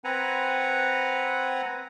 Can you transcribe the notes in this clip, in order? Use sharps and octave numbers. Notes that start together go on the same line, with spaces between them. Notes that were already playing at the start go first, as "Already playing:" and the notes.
C4 B4 F#5 G#5 A#5